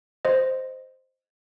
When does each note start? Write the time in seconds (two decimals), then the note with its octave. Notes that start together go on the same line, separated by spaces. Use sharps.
0.25 C5 D#5